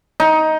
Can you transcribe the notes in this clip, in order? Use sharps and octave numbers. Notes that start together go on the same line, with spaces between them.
D#4